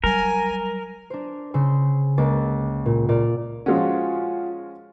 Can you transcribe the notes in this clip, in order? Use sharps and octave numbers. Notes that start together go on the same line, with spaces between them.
F#3 G3 A#4 G#5
D4 C5
C#3 C5 C6 E6
C#2 A#3 D6 A6
A#2
A#2 D5 F6
F3 G#3 C#4 F4 F#4